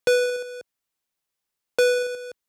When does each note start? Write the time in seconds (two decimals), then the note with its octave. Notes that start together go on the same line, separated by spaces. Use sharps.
0.07 B4
1.79 B4